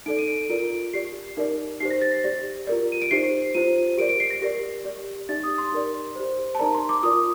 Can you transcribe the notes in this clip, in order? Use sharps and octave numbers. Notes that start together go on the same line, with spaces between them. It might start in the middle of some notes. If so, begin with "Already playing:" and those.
D#4 A4 D5 D7
D#7
D7
F4 A#4 D5 D7
G4 D5 C7
D#4 A#4 D5
D#4 G4 C5 C7
A#6
A6
A#6
G4 D5
F4 A#4 D5
D#7
D7
D#4 G4 C5 C7
F4 C5 D#7
G4 A#4 D5 D7
D7
C7
A#6
G4 A#4 D5
G4 D5
D#4 G4 D5 A6
D#6
C6
D#4 A#4 D5
G4 C5
A5
D#4 A#4 D5 A#5
C6
D6
F4 A#4 D5 D#6